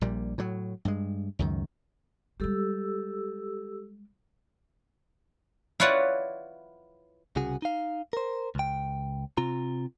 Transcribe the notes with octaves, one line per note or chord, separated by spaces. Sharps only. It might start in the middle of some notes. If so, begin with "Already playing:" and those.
A#1 A#2 G3
A2 F#3
G2 G#3
C#2 F#2 D#3
G3 G#3 G4 A4 E6
E4 F4 B4 C#5 D5 F#5
C2 C#3 F#4 G#4
D#4 F5
A#4 C5
C#2 G5
C3 C4 F4 A#5